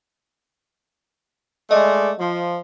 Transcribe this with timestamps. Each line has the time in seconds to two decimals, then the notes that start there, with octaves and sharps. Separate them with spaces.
1.71 G#3 A3 D5 D#5
2.18 F3